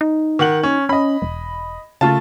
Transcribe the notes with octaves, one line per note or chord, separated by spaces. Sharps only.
D#4
D#3 F#5 F#7
C#4
C#4 D#5 B5
E1
C#3 A3 F4 A5